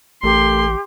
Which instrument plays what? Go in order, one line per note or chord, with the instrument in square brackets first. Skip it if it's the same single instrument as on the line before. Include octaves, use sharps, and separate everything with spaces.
[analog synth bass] A1 [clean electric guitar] A3 A4 A#4 [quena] G4 [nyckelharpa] C6